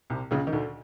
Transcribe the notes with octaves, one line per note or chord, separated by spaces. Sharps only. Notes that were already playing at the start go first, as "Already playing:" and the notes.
C2 C3
C#2 C#3
D#3
D2 D3